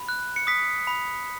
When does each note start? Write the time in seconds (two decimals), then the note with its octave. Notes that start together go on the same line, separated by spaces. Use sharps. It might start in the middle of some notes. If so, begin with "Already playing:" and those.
Already playing: B5
0.09 F#6
0.36 C#7
0.47 D#6 B6
0.87 B5